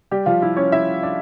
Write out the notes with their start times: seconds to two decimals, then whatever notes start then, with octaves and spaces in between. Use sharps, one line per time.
0.11 G3 G4
0.26 F3 F4
0.42 E4
0.57 C#4 C#5
0.72 E4 E5
1.03 D4 D5